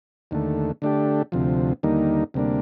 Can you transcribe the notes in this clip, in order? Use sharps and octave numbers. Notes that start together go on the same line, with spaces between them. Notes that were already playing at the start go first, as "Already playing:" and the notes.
D#2 D3 A3
D3 A3 D4 G4
D2 C3 F3
D#2 D3 G3 A#3 D#4
D2 C3 G3 A#3 D4